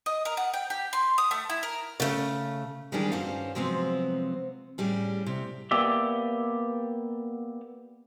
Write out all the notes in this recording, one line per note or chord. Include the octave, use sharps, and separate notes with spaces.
D#5
A#4
F#5
G5
G4
C6
D#6
A3
E4
A#4
C#3 A3
D#3 E3 G3 G#3 D4 G#4
G2 C#4 F#4 C5 F5
C3 F3 F#3 G#3 B3 C4
A2 G3 C#4 G#4
C3
A#3 B3 G4 D5 E5